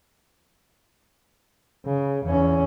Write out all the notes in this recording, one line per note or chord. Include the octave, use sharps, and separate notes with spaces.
C#3
E2 C#4